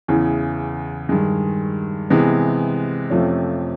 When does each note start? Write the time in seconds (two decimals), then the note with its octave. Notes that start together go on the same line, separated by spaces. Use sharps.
0.08 E2 C#3 E3
1.09 G2 D#3 G#3
2.10 C3 E3 G#3 B3
3.10 F2 C3 F3 A3 C#4